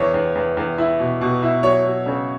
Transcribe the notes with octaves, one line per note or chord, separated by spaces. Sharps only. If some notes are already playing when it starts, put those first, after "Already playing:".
Already playing: E2 C#5
E2
E2
E2
E4
B2
B2
E4
F#3 C#5
F#3
C#3